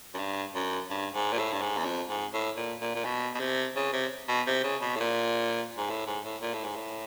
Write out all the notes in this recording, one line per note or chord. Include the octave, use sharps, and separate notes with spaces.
F#2
G2
F#2
G2
G#2
A#2
A2
G2
G#2
E2
F2
G#2
A2
A#2
A#2
A#2
B2
B2
C3
C#3
C3
B2
C3
C#3
B2
A2
A#2
G#2
A2
G#2
A2
A#2
A2
G#2
A2